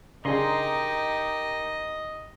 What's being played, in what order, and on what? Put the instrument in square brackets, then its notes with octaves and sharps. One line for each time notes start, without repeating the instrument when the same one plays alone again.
[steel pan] C#3 D4 G#4 [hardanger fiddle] D#4 G4 [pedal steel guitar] A#4 C6 [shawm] D#5